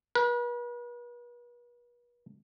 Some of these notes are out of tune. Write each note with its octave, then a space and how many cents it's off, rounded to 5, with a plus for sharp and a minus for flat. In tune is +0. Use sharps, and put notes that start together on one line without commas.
B4 -40